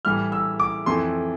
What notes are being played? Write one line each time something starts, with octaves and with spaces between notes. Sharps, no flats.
A2 E3 G3 F6
E6
D6
F2 E3 A3 C6